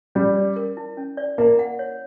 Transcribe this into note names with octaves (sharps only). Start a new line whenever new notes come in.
G3 C#4
D5
A#4
E4
C#4
D5
A#3 E4
F#5
C#5